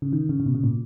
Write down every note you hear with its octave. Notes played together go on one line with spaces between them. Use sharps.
C#3
D#3
C#3
C#3
B2
C#3
A#2